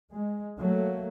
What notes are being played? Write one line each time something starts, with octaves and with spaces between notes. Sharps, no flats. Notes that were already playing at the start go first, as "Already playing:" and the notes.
G#3
F#3 A3 A#3